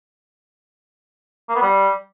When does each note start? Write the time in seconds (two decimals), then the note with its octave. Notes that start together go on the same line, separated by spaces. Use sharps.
1.49 A#3
1.56 B3
1.62 G3